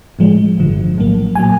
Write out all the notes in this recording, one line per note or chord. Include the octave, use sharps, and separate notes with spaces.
A2 F3 G#3
G1 G2 D3 F3
A#1 A2 F#3 A#3
A#2 F#3 A#3 G#5